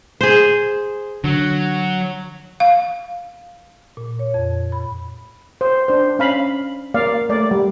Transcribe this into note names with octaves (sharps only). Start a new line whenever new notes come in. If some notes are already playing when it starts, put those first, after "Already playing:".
G#4 C5
D3 F#3
F5
A#2
C#5
F2
B5
C5
D4 C5
C#4 F5 B5
A#3 D5 F5
A3 D5
G3